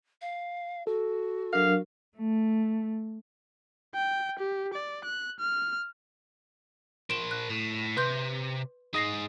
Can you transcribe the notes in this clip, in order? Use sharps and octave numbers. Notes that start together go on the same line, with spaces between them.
F5
F#4 A4
F#3 D4 A#4 F5
A3
G5
G4
D5
F#6
F6
A#4 C5 D7 E7 G7
F#6
A2
C3 B4 C6 G6
G#3 D#4 D#6 A#6 C7